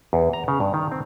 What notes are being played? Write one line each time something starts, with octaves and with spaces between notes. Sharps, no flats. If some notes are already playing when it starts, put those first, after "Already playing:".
E2
A#5
C#3
G2
D#3
C4